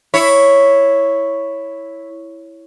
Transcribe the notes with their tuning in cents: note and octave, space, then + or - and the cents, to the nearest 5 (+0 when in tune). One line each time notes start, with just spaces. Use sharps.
E4 +0 C#5 +0